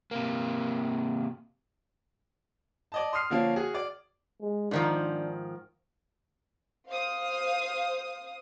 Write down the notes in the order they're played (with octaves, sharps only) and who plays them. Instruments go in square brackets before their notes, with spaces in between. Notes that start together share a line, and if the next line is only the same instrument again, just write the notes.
[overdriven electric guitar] C3 A#3
[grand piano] D5 D#5 A5
C6 D#6 F6 C7
D3 F3 A#3 C#4 D4
F#4 G#4
D5
[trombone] G#3
[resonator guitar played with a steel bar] G#2 D#3 F3 [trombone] D4
[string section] C5 F5 D#6